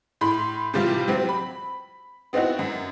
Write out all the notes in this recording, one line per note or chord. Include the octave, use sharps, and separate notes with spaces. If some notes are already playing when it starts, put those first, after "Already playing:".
A2 B5 C6
A2 C3 E3 G3 F4 G4
F#3 C4
B5
B3 C4 D#4 E4 F#4
F#2